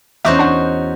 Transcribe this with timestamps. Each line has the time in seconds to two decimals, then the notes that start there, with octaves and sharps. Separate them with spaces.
0.25 E2 C#4 D#4 F#4 C5 E5 D6
0.39 D4 F#5